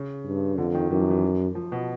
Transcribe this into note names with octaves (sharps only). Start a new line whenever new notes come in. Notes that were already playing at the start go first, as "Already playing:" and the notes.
Already playing: C#3
G2
F2 D3
D#3
F#2 E3
F3
E3
F3
B2